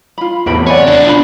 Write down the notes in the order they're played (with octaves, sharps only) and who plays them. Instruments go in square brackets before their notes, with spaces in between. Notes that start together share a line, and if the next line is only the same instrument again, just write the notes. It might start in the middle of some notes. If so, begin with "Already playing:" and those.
[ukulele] F4 B5
[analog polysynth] E2 A2 C3 [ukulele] E5 G5 B5
[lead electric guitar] C#5 [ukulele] D5 F#5 G#5
[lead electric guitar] B2 D4 [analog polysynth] F#6
[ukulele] F4 B5